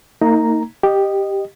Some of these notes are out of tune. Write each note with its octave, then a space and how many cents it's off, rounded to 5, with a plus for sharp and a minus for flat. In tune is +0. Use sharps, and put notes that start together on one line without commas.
A#3 -35 D#4 +20 A#5 +0
G4 +0 D#5 -15